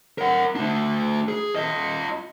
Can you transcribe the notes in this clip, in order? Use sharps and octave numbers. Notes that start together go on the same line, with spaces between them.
A#4 F#5
A3 D4
G#4
F4 D#5